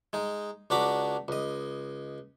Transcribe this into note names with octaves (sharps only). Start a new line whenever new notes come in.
G#3 D#4
C#2 D4 F#4 A#5 B5 D6
C#2 D#5